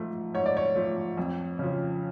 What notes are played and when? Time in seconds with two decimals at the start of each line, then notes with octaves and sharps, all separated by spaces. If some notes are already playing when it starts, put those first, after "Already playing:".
Already playing: G#2 F3 A3
0.34 G#2 C#5
0.46 D5
0.57 C#5
0.76 F3 A3
1.17 F2
1.59 C#3 F3